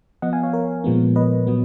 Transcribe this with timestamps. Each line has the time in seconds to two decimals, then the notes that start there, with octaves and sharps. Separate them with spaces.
0.22 F3 B3 D#5 F#5
0.33 F5 G#5
0.43 C#5 F5
0.53 A#4 C#5
0.84 A#2 F3 G#3 B3
1.16 B4 D#5
1.47 A#2 F#3 B3